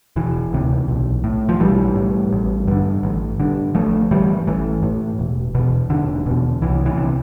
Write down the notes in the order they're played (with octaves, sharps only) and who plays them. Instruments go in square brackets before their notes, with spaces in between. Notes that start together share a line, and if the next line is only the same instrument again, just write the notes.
[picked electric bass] E1 E3
D2 C3
B1
A2
F3
B1 E3 G3
A2
A1
G2 D3
A1
G2 D3
A1 F3 A3
A2 E3 G3
A1 E3
A2
E1
E2 B2
E1 D3
E2 B2
C2 E3
E3
C3